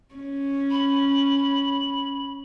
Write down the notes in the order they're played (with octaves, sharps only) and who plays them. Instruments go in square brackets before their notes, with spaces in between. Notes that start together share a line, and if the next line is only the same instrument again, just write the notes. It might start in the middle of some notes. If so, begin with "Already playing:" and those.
[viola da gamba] C#4
[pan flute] B5